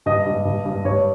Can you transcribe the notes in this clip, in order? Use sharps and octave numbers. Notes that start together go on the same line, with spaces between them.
G2 D#5
G2
G2
G2
G2 C#5